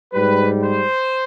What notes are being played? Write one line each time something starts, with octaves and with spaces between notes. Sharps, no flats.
G#2 G3 B4
C5